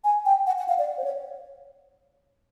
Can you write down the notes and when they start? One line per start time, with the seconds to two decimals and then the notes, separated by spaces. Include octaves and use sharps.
0.04 G#5
0.26 G5
0.47 F#5
0.58 F#5
0.68 F5
0.79 D5
0.98 C5
1.04 C#5